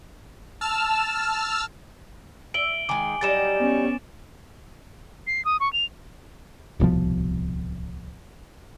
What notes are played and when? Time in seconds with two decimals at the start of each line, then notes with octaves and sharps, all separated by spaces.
0.61 A5 E6 F6
2.54 E5 D7 F#7 G7
2.89 D#3 G#3 G#5 D6
3.21 F#3 G3 D#4 A6 E7
3.59 B3 C#4
5.27 C7
5.45 D#6
5.60 C#6
5.73 F7
6.80 D1 C2 B2 F3